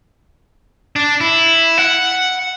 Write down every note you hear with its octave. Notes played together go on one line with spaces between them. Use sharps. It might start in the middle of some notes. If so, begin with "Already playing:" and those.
D4
E4
F#5